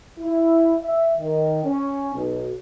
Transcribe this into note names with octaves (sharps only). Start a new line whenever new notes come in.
E4
E5
D#3
C#4
B1